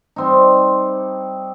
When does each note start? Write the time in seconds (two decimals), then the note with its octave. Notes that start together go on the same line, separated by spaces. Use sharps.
0.16 G3 C4 D#4